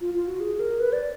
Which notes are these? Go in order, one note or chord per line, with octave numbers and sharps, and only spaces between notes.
F4
F4
F#4
G#4
A#4
B4
D5